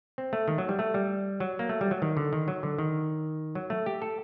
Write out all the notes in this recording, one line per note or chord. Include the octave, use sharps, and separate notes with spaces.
C4
A3
D#3
F#3
G3
A3
G3
F#3
A#3
A3
G3
F#3
D#3
D3
D#3
F#3
D3
D#3
F#3
A3
G4
A4